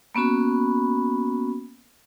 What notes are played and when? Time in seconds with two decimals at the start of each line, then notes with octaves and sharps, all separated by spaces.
0.15 A#3 B3 C#4 F#4 B5